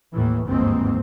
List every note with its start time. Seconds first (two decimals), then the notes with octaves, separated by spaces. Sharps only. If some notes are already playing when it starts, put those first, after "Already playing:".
0.12 D#2 A2 E3
0.46 G1 D#2 G#2 E3 C4